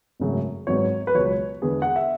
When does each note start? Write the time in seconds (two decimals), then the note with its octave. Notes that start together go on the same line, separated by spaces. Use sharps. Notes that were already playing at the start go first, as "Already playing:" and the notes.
0.20 G#1 F#2 C#3 F#3 A3
0.67 G#1 G#2 F#3 B3 C#5
1.07 B4
1.14 C#2 B2 F#3 C#5
1.62 E2 D3 G#3 B3 G#4
1.82 F#5
1.96 E5